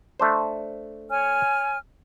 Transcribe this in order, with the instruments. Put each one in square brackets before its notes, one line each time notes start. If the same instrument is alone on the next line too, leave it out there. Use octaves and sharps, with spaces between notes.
[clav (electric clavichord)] A3 D4 C5
[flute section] C#5 G#5 F6